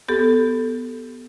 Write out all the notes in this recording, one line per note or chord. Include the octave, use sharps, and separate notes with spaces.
B3 G4 A4